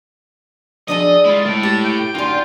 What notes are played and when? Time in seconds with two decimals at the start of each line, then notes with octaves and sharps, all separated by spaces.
0.88 F3 D4 F#4 G#4 A4 D5 D#5 D#6
1.25 G#3 E4 F4
1.45 A2 G#3
1.63 G4 A5
1.84 A3 G5
2.15 F#2 D3 D#4 F4 B4 G#5 C6